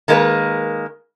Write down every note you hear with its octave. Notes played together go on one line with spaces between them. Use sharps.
D#3 G#3 A#3 D#4 B4